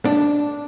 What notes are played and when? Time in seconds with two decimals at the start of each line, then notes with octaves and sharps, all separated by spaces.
0.05 D4